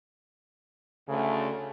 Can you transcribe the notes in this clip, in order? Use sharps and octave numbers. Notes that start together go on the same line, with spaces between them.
D2 C#3 A3